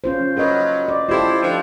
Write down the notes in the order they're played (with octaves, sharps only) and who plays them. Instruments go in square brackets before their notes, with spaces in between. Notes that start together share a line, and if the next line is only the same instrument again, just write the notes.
[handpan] C#4 F4 C5
[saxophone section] F#3 [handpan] A#4 B4 D#5
[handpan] D5
[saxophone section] E4 C5 [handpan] F4 G4 A4
[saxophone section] D3 F3